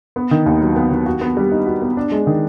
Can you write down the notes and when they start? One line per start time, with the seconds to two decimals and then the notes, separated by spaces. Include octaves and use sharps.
0.16 B3
0.31 D#3
0.46 D#2
0.61 F#3
0.76 B3
0.91 D#3
1.06 F#4
1.21 B3
1.37 G3
1.52 D#4
1.66 F#4
1.82 B3
1.97 D4
2.12 G#3
2.27 D#3